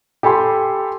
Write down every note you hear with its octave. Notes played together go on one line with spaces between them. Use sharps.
G4 A4 G#5 B5 C6